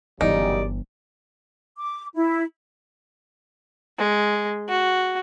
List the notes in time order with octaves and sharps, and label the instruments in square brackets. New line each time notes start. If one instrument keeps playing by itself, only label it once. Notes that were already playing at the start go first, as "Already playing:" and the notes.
[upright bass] G1 E3 [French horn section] F#2 C#3 G3 [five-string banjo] D#4 [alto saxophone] D5
[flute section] D6
E4
[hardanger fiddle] G#3
F#4